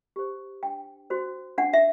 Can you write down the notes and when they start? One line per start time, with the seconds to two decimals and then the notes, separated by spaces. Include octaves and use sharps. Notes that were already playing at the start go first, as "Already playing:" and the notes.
0.16 G4 C5
0.63 D4 G5
1.10 F#4 C5
1.58 D4 F#5
1.73 E5